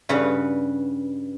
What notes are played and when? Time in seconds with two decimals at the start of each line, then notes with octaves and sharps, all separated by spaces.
0.09 G2 C#3 F#4 B4 F#5